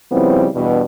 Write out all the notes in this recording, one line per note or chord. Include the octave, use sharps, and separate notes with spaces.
C#3 F3 G3 B3 C4 E4
E2 G2 B2